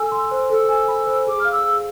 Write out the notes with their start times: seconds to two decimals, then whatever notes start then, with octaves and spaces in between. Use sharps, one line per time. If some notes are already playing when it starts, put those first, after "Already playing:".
Already playing: A4 G#5 E6
0.12 C6
0.31 C5
0.50 A4 E6
0.68 G#5
0.88 B5
1.07 C5
1.27 G#4 D6
1.40 F5 F6
1.51 E6
1.64 G#4